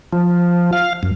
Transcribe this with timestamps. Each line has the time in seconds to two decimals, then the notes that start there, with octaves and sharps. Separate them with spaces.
0.13 F3
0.73 F5
1.03 F#2